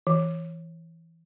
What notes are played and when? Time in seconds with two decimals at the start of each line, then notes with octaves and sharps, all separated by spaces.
0.07 E3